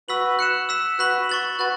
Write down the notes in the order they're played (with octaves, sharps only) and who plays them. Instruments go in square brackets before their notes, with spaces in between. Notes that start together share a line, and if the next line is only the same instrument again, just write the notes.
[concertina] F#4 B4 [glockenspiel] E6 B6 F#7
[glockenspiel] F#6 C#7 E7
E6 B6 E7
[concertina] F#4 B4 [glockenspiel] F#6 B6 F#7
[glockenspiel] C#6 A6 F#7
[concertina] F#4 B4 [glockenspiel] F#6 A6